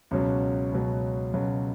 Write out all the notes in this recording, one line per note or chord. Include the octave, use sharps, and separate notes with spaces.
C#2 B2 F#3 C#4
C#2 B2 F#3
C#2 B2 F#3